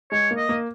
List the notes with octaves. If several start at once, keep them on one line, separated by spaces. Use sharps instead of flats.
G#3 C#5
A#3
D#5
A#3